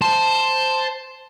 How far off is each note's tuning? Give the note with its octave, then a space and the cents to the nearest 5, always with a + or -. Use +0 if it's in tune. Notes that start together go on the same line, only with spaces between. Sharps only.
C5 +0 A5 +0